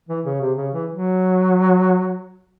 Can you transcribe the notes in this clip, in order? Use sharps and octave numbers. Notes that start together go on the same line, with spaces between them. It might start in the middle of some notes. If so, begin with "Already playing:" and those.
E3
C#3
C3
C#3
E3
F#3